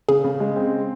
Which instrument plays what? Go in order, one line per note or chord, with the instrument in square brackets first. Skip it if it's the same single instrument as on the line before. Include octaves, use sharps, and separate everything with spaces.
[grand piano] C#3 [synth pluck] G#4
[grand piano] C#3
G#3
C4